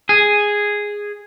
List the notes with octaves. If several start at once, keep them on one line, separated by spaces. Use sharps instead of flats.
G#4